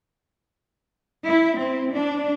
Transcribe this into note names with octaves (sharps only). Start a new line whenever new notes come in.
E4
C4
D4